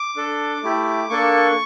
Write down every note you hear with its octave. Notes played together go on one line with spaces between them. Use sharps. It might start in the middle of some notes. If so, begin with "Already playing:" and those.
Already playing: D6
D4 A4
A3 E4 G4
A#3 D4 A4 C#6